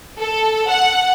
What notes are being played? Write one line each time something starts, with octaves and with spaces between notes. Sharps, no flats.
A4
F#5